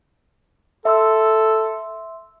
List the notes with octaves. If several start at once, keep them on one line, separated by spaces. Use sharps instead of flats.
A4 E5 C6 E6